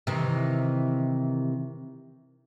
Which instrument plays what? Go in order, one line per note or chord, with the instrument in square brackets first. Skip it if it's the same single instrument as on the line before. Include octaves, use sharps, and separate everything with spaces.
[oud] C3 D#3 E3